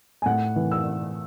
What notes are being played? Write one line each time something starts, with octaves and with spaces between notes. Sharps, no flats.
G#5
A2 F#5
E3
E6